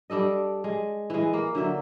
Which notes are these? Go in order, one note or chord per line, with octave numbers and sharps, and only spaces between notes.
G3 D4 A4 D#5
G#3
E3 G#3
A#3
D3 F#3 E5